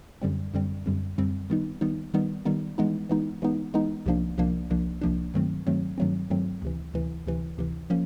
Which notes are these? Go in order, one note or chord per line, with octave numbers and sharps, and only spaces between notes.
F#2 D3 G3 C4
F#2 D3 G3 C4
F#2 D3 G3 C4
F#2 D3 G3 C4
D#3 G3 B3 D#4
D#3 G3 B3 D#4
D#3 G3 B3 D#4
D#3 G3 B3 D#4
E3 G#3 B3 D#4
E3 G#3 B3 D#4
E3 G#3 B3 D#4
E3 G#3 B3 D#4
C2 C3 F3 A#3 D4
C2 C3 F3 A#3 D4
C2 C3 F3 A#3 D4
C2 C3 F3 A#3 D4
G2 D#3 F#3 A3 C4
G2 D#3 F#3 A3 C4
G2 D#3 F#3 A3 C4
G2 D#3 F#3 A3 C4
D2 C3 E3
D2 C3 E3
D2 C3 E3
D2 C3 E3
F3 A#3 C#4